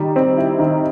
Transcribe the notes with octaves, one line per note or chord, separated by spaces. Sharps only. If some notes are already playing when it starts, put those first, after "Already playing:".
Already playing: D#3 G3
C4
E4
D#3